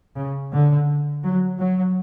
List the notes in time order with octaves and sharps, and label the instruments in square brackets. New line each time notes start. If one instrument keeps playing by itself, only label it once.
[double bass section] C#3
D3
F#3
F#3